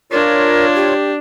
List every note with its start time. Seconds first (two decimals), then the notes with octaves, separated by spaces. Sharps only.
0.12 D4 F4 A#4 C#5
0.75 G4